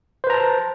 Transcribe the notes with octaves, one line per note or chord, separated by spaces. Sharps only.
B4 C5 A5 A#5